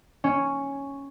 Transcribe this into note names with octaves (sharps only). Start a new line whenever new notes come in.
C#4